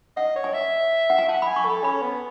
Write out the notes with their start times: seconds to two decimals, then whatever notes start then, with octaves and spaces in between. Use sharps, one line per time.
0.16 D#5 F#5
0.36 C#5
0.44 G#5
0.53 E5
1.10 F#5
1.19 G#5
1.29 F#5 A5
1.42 B5
1.47 G#5
1.56 C#6
1.65 A4 B5
1.83 C#4 B5
2.02 B3